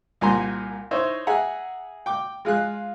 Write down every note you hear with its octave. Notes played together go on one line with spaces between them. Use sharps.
C2 A#2 G#5 A#5 C6
D#4 E4 C5 C#5
G#4 E5 F#5 A#5
G5 D6
G#3 F4 G#4 F#6